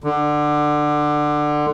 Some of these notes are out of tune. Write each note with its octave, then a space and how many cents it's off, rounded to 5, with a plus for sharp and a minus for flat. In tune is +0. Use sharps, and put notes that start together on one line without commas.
D3 +15